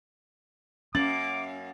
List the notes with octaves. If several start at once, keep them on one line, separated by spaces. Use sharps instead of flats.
F#2 A#3 C#4 D6 A6 F#7